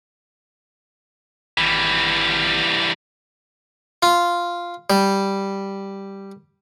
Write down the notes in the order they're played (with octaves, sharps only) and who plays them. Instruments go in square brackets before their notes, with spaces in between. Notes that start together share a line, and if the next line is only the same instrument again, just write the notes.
[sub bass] G#1 [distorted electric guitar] E3 G3
[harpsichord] F4
G3